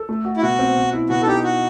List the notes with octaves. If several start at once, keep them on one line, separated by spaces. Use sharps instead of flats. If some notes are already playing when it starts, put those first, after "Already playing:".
Already playing: A4
A3
F#4
E4
B2 F#4
C4
B2
E4
B2 F#4
A4
D#4 G4
F#4